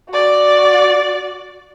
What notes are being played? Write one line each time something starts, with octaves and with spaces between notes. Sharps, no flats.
F#4 D5